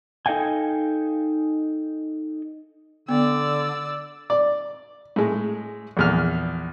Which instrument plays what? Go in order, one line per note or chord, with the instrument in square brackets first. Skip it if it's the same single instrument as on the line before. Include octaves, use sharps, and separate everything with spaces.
[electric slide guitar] D#4 A4 D#5 F5 G5 G#5
[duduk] D3 [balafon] B3 [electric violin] D5 E6
[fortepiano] D5
A2 G#3
A#1 E2 F6